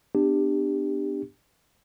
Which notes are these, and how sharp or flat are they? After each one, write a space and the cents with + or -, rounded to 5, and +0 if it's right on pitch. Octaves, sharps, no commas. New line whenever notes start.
B3 +20 D4 +15 G4 +10